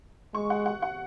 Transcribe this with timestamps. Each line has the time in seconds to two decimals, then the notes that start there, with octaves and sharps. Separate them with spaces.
0.34 G#3 C#6
0.50 F#5
0.66 F#5
0.82 F#5